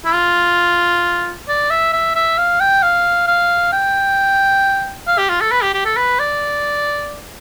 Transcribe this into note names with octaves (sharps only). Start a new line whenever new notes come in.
E4
F4
D5
E5
E5
E5
F5
G5
F5
F5
G5
F5
G4
F4
A4
B4
G4
G4
A4
B4
D5